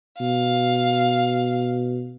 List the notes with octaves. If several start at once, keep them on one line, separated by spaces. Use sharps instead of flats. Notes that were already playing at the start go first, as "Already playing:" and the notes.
B2 F5